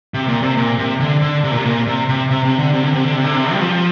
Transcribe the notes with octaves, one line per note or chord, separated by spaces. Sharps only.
C3
A#2
C3
A#2
C3
D3
D3
C3
A#2
C3
A#2
C3
C3
C3
C3
D3
C3
D3
C3
D3
C3
D3
C3
G3
F3